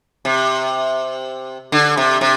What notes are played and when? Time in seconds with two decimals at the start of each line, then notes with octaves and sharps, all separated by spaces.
0.25 C3
1.72 D3
1.97 C3
2.21 C3